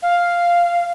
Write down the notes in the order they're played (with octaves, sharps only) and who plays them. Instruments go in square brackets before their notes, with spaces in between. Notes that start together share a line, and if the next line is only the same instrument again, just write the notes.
[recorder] F5